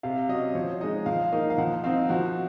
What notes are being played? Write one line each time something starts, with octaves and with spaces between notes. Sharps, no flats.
C3 F5
F#3 C#4 D#5
F3 C#5
G#3 D#4 D#5
F3 F5
A#3 D#4
F5
F3 F#5
C4 D#4 F5
F3 F#4